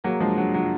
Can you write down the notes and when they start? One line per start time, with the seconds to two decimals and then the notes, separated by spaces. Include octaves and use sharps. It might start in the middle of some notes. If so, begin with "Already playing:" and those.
0.04 F#3 A#3 G#4
0.20 F3 G#3 D4
0.37 F#3 D4
0.54 F#3 F4